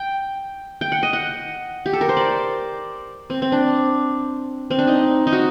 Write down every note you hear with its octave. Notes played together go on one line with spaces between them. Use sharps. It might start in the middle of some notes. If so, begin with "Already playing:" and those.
Already playing: G5
G5
F#5
D#5
F#5
G4
A4
A#4
C5
D5
C4
C4
D4
C4
D4
D#4
D#4
F#4